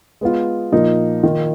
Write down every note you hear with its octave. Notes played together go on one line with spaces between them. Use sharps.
G#3 B3 F4
A#2 F3 A#3 D#4
D#3 A#3 F4